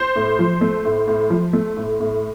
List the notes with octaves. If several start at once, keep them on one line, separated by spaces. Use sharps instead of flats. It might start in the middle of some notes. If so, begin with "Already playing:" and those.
Already playing: C5
A2
F3
A3
A2
A2
F3
A3
A2
A2